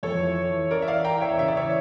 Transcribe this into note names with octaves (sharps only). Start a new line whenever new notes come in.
F2 A4 C#5
E3
E3
E3
C#4 A#4 D5
E5
E3 D5 F5
E3 G5 A#5
E2 C#5 E5
C#3 E5
D5
E3 C#5 E5